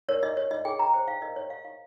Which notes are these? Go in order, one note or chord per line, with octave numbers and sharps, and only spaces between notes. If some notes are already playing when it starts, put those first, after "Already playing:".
A#4 C#5
D#5
C#5
D#5
G#4 G5
A#5
C5 G5
F5
A#4 D#5
C#5
C#5 F5
F5